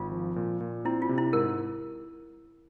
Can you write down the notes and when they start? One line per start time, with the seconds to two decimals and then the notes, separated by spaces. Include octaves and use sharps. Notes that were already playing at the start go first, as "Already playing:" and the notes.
Already playing: G#1 F4
0.12 F3
0.36 A#2
0.61 A#2
0.85 C4 E4
1.02 F4
1.09 C3
1.18 E4
1.33 G#2 A#4